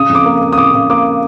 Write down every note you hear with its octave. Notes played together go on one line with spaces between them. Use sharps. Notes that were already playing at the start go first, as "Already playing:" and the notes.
Already playing: C#3 D#6
F2
D6
A#3
A#3
D#6
C#3 D6
C#3
A#3 D6